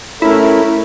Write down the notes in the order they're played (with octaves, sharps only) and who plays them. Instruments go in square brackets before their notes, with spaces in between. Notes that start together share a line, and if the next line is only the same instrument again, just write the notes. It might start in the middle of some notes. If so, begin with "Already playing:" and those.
[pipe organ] A3 C#4 A#4 [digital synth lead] E4